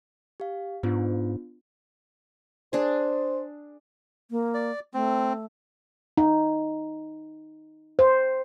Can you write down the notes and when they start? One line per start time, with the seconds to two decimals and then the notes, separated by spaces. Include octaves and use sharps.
0.40 G4 F5
0.83 G#2 B3 D4 F4
2.73 D4 G#4 C5
4.31 A#3
4.54 D5
4.94 A3 C4
6.17 D#4
7.99 C5